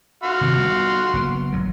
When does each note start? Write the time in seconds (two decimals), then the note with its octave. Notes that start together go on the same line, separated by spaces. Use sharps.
0.24 F#4 F5 C6
0.41 C3 D#3
0.58 G3 B3
1.14 F#1 A#3 B3
1.53 A1 F#3